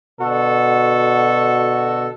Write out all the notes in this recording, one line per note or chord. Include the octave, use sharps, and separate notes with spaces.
B2 D3 F#4 A4